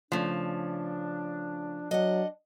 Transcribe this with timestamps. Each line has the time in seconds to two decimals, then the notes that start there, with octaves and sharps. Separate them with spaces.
0.12 C#3 F3 A3 D4
1.91 F#3 D4 D#5 F#5